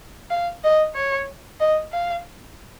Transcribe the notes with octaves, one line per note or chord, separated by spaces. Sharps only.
F5
D#5
C#5
D#5
F5